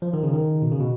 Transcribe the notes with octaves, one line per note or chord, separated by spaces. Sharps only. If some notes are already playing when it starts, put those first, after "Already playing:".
F3
D#3
C#3
D#3
B2
C#3
B2